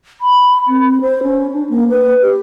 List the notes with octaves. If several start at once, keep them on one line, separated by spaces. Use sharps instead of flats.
B5
C4
C5
C#4
D4
A#3
B4
G4